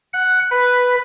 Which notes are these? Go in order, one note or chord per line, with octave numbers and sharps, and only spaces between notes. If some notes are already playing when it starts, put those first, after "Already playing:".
F#5
B4